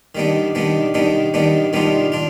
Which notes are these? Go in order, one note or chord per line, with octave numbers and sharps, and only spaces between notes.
D#3 G3 B3 D4
D#3 G3 B3 D4
D#3 G3 B3 D4
D#3 G3 B3 D4
D#3 G3 B3 D4 F4
D4 F4